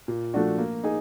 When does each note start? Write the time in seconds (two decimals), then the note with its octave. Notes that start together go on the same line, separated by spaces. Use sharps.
0.08 A#2
0.34 F3 A3 D4 F#4
0.58 A#3
0.84 D#4 G#4